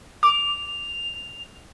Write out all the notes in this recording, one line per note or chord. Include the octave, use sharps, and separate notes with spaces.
D6 F7